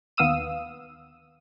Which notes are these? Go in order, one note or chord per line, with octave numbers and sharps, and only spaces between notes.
D#2 B3 F5 D#6 E6 D#7